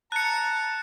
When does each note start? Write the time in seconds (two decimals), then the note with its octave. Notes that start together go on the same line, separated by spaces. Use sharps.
0.12 A5 A#5 F#6 C#7